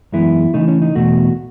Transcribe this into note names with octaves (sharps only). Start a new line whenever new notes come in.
F#2 E3 G#3 B3 E4
C#3 E3 A3 D#4
C#4
D#4
E2 B2 A3 F#4